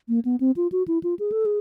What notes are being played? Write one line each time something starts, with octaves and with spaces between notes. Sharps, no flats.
A#3
B3
C4
F4
F#4
E4
F4
G#4
A4
G#4